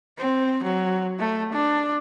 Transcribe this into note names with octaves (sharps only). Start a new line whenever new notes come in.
C4
F#3
A3
D4